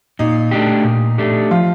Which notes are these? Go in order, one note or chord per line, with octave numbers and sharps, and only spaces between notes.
A#2 D#4
A3 D4 G4
A#2
A3 D4 G4
F3 F4